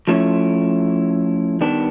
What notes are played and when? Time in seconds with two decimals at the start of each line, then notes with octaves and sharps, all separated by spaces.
0.07 F3 A3 C#4 E4
1.61 D#3 G3 B3 D4